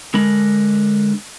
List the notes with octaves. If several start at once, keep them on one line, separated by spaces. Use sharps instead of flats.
D3 G#3 D4 A#4 B5